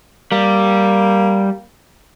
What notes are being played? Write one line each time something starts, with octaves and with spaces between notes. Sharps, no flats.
G3 A#3